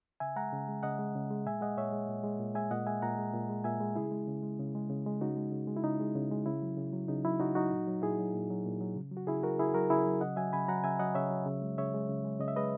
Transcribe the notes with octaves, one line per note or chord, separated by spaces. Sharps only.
C#3 E5 G#5
G#3 F#5 A#5
C#3
G#3
C#3 D#5 F#5
G#3
C#3
G#3
A#2 E5 G#5
G#3 D#5 F#5
A#2 C#5 E5
G#3
A#2
G#3
A#2
G#3 E5 G#5
A#2 D#5 F#5
G#3 E5 G#5
A#2 F#5 A#5
G#3
A#2
G#3
A#2 E5 G#5
G#3
C#3 E4 G#4
G#3
C#3
G#3
C#3
G#3
C#3
G#3
C#3 D#4 F#4
G#3
C#3
G#3
E4
C#3 D#4
G#3
C#3
G#3
C#3 E4
F#3
C#3
F#3
C#3 D#4
F#3 E4
C#3 D#4 F#4
F#3 D#4 F#4
A#2
F#3
A#2 E4 G#4
F#3
A#2
F#3
A#2
F#3
C#3
F#3
F#4
C#3 E4 G#4
F#3 F#4 A#4
C#3 E4 G#4
F#3 F#4 A#4
C#3 E4 G#4
F#3
C#3 D#5 F#5
F#3 E5 G#5
C#3 G#5 B5
F#3 F#5 A#5
C#3 E5 G#5
F#3 D#5 F#5
C#3 C#5 E5
F#3
C#3
G#3
C#3 C#5 E5
G#3
C#3
G#3
C#3 D#5
E5
G#3 B4 D#5